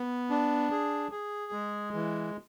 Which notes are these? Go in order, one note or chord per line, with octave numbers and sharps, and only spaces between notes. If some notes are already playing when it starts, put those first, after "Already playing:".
Already playing: B3
D4
G#4
G#4
G#3
E3